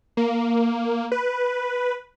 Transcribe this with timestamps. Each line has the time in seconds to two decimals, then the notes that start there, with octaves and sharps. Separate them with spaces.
0.17 A#3
1.12 B4